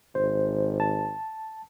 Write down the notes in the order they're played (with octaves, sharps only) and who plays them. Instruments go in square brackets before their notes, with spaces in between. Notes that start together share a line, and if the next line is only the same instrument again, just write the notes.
[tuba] G#1 [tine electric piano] C5
[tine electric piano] A5